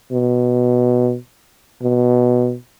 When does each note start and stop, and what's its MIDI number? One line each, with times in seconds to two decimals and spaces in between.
0.12 1.15 47
1.83 2.55 47